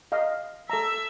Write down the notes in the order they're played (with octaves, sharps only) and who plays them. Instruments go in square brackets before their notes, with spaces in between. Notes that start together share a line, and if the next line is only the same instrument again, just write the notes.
[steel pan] D#5 F5
[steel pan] A4 A#5 [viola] E5